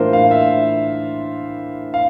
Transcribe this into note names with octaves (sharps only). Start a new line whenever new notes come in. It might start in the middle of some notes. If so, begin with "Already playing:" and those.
Already playing: A2 E3 A#3 D4 F4 A#4 C5
F5
E5
F5